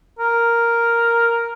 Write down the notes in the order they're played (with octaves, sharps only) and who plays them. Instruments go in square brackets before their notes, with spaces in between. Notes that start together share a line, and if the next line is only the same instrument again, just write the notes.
[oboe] A#4